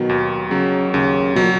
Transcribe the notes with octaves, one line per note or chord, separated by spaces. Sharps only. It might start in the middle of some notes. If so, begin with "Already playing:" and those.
Already playing: B2 D#3 F#3
D#2
C#3 F#3
D#2 C#3
B2 F#3
A#2